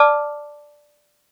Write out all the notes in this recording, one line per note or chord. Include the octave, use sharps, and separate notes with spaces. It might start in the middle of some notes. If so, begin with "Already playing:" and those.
Already playing: D5 A5 D6 F6